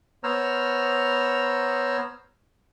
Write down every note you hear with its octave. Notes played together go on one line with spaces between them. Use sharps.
B3 C5 C#5 A#5 E6 F6